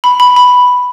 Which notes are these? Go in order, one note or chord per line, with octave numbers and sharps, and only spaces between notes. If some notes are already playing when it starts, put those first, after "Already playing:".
B5
B5
B5